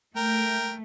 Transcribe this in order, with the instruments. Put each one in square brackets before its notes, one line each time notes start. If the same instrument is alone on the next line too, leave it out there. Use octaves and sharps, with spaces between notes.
[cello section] A3 [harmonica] A#4 G5